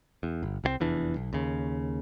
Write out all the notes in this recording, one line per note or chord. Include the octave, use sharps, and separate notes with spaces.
E2
G1
C2 E3 C4
F1 E2 E3 D4
B1
D#2 C#3